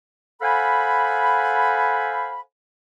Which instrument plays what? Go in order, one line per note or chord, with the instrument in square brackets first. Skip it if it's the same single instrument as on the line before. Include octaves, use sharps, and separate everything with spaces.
[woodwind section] A4 C5 F5 F#5 G#5 B5